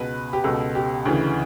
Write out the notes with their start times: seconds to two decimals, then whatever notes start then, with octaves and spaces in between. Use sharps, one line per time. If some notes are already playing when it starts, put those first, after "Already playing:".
Already playing: C#2 B2 B4
0.33 G4
0.44 C#2 B2 A4
0.75 G4
1.05 D2 C#3 E3